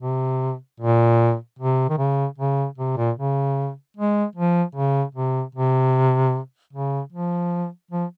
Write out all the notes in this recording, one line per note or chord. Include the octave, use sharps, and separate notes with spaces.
C3
A#2
C3
D#3
C#3
C#3
C3
A#2
C#3
G#3
F3
C#3
C3
C3
C#3
F3
F3